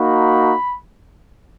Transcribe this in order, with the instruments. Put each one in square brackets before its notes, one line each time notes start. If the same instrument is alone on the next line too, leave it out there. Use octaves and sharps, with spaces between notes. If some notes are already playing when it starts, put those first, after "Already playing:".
Already playing: [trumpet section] A#3 D#4 F#4 B5